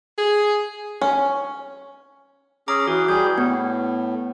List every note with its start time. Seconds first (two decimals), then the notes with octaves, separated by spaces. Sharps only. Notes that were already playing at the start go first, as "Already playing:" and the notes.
0.18 G#4
1.01 C#4
2.68 C#4 G#4 A#5 D6
2.88 E3 F#4
3.08 G3 G#4 G6
3.38 A2 B3